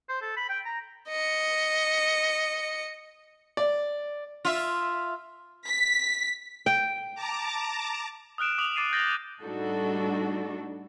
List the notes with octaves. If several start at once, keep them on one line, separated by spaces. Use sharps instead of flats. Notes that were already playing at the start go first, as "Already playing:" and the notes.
C5
A4
B5
G5
A#5
D#5 C#7
D5
F4 E5
B6
G5
A5 A#5 D6
D#6 F6 F#6 D7 E7
D6 D#6 F7 F#7
D6 A6 C7 D#7
G6 A6 A#6 D7 F#7 G7
A2 G3 D4 D#4 F#4 A4